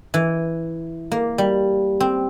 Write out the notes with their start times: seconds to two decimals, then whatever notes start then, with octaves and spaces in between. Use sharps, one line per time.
0.14 E3
1.12 A#3
1.38 G3
2.00 C4